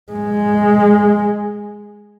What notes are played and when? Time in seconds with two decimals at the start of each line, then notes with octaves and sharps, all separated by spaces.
0.12 G#3